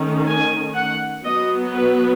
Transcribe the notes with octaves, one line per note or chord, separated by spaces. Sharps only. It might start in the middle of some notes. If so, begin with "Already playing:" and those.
Already playing: D#3 A3 C#4
G#5
F#5
F#3 B3 D#5
B4